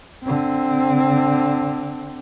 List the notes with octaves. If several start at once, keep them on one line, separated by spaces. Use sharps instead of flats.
D3 C4